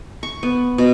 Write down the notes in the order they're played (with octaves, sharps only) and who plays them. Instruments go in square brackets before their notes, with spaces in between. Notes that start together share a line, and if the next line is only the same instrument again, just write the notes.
[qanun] C#6
B3
B2